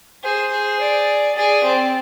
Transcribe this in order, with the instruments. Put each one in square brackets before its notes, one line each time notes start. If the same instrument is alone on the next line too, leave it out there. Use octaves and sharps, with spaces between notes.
[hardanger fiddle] G#4 [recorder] C5
[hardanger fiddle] G#4
[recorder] D5
[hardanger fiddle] G#4 [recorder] D5
[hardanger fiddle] C4